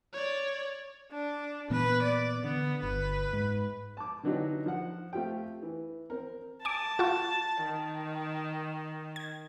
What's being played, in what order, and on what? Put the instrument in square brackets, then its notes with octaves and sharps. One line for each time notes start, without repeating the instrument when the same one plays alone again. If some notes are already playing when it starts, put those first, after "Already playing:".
[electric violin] C#5 D5
[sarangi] D4
[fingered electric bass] A#2 E3 B3 [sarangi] B4
[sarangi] D5
[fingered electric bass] D3 [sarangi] B3
[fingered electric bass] G1 [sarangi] B4
[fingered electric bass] G#2
[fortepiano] A5 D6
D3 E3 F#3 D4 D#4 G4
F3 F#5
A3 C4 F4 G4 G5
E3
C4 A#4
[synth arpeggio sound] G#5 D6 [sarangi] A5
[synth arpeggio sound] F4 F#4 C#6
[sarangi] D#3
[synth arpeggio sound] G#6